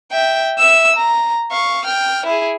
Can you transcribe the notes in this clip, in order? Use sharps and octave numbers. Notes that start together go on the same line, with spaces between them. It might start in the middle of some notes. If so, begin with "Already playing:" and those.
E5 G5
E5 E6
A#5
F5 C#6
G5 F6
E4 G#4